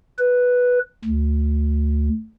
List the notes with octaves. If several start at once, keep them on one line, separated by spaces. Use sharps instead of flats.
B4
D2